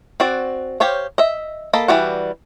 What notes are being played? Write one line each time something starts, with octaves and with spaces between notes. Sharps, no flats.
C4 F#4 D5
G4 C5 C#5 F5
D#5 E5
A#3 A4 D#5 B5
E3 G3 F#4